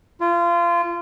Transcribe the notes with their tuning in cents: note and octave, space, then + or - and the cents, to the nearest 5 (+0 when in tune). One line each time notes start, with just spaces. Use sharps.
F4 -25